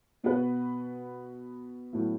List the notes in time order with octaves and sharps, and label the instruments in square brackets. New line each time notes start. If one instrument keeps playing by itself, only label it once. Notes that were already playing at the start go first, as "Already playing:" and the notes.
[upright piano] B2 B3 F#4 B4
A2 F#3 B3 E4